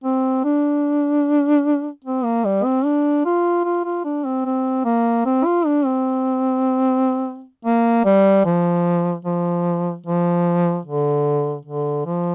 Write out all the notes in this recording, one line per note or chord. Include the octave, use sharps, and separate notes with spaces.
C4
D4
C4
A#3
G3
C4
D4
F4
F4
F4
D4
C4
C4
A#3
C4
F4
D4
C4
A#3
G3
F3
F3
F3
D3
D3
F3